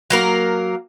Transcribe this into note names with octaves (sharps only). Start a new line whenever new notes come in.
F#3 A#3 A#4